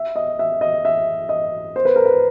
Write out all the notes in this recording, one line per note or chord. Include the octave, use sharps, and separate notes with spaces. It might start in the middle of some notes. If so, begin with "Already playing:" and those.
Already playing: E5
D#5
E5
D#5
E5
D#5
C5
B4
A#4
B4